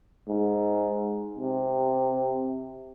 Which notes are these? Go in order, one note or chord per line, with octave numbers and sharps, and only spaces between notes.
G#2
C3